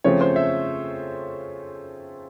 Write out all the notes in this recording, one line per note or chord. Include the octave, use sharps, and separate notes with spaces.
C#3 F3 A3 C4 C#5
C5
E5